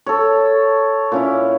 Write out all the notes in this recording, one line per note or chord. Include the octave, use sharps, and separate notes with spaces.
A4 C#5
A#2 C#4 E4